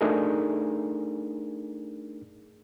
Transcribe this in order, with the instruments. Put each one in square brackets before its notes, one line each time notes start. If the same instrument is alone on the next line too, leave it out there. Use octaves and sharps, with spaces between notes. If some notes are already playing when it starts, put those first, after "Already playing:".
[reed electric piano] A3 D4 D#4 G#4 A#4